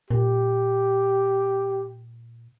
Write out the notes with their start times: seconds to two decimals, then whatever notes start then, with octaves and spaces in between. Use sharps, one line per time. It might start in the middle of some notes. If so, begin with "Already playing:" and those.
0.11 A#2 G4